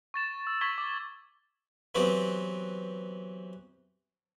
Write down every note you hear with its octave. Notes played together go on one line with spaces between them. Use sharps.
C#6 A6 E7
E6
C#6 G#6 B6 F#7 G7
D6
E3 F#3 B3 C4 G4